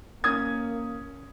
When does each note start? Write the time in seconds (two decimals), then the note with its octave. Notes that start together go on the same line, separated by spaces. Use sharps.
0.24 A#3 C#4 D#6 G#6